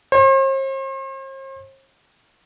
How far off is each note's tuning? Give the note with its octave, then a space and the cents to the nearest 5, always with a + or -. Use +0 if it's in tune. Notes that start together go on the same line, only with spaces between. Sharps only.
C5 +45